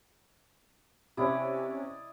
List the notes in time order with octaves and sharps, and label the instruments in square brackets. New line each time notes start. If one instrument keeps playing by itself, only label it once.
[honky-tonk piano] C3 C#4 [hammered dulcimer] E4 D5 D#5